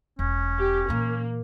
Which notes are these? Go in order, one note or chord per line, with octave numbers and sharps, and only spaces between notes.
E1 C#4
G4
A#2 E3 A#3